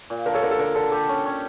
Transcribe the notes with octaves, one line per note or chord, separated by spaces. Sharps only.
A#2
D3 A#4
A4 C#5
D3 A#4
A4
D3 A#4
D3 A4
G4 A4
C#4
C#4